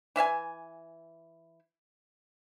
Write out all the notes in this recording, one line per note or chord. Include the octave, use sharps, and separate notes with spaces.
E3 E5 F5 G#5